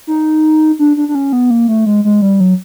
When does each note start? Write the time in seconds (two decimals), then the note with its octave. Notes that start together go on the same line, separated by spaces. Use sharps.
0.07 D#4
0.79 D4
0.97 D4
1.09 D4
1.15 C#4
1.33 B3
1.50 A#3
1.68 A3
1.86 G#3
2.05 G#3
2.22 G3
2.40 F#3